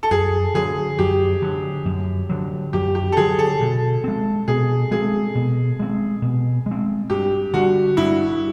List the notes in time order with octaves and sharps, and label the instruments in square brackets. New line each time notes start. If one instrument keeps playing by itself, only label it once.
[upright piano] A4
[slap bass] F#2 [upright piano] G#4
[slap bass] D3 F#3 [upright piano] G#4
[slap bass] F#2 [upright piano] G4
[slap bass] D3 F#3
F#2
D3 F#3
[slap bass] F#2 [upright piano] G4
[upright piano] G4
A4
[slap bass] D3 F#3 [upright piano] G#4
[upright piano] A4
[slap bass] B2
G#3 C4
[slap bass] B2 [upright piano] G#4
[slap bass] G#3 C4 [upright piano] G#4
[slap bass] B2
G#3 C4
B2
G#3
C4
[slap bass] G2 [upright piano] G4
[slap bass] D3 G3 [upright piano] F#4
[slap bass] G2 [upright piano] E4